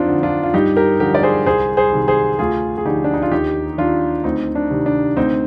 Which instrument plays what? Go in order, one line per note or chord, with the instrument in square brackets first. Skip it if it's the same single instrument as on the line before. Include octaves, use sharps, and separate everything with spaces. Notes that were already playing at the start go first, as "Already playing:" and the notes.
Already playing: [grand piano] F2 C4 D4 D#4 F4
D3 F3
D4 F4
F4
G2 D#4 G4
G4 A#4
D3 F3 G4 A#4
D5
G#4 C5
C2 G#4 C5
G#4 C5
C3 D#3
G#4 C5
D2 F4 G#4
G#4
D3 F3 D#4 G4
D4
D#4
F4
D#2 D#4 G4
D#3 D4 F4
D2 C4 D#4
D4
C3 D#3
D4
D2 C4 D#4